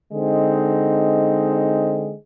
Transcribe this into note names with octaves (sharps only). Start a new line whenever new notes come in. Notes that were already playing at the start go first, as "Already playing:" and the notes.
D3 G#3 C4 D#4